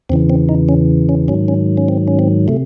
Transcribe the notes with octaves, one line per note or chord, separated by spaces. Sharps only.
E2 C#3 E3 C4
C4
D#4
C#4
C#4
G#2 D#3 F#3 C#4
C#4
C#4
C4
C#4
C4
C3 A3